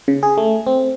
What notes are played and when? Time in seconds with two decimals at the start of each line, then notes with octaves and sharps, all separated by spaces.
0.08 C#3
0.23 G#4
0.38 A3
0.67 C4